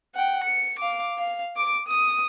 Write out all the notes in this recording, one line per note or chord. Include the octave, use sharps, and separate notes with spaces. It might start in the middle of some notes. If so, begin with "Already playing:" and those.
F#5 G5
C#7
F5 D6
F5
D6 D7
D#6